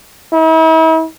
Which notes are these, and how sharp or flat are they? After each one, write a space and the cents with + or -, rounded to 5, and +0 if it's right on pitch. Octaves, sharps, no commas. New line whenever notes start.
E4 -40